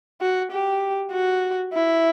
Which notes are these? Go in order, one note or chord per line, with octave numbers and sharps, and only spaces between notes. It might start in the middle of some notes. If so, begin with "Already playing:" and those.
F#4
G4
F#4
E4